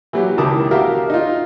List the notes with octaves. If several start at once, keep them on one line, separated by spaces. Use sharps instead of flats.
E3 F#3 G4
C#2 D#3 E4 A5 D6 D#6
F#4 G4 A#4 E5 F5 G5
D#4 F4